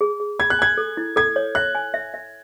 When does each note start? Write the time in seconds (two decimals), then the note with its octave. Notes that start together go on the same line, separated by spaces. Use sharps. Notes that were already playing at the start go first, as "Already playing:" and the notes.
0.01 G#4
0.20 G#4
0.39 B5 G#6
0.50 F#6
0.59 G#5 G#6
0.78 A4
0.97 E4
1.16 A4 G#6
1.36 C#5
1.55 E5 F#6
1.75 G#5
1.94 E5
2.14 E5